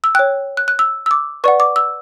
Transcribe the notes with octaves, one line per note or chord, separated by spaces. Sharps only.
E6
C#5 G5 F#6
F#6
F#6
E6
E6
D6
B4 D5 F#5 C#6
D6
E6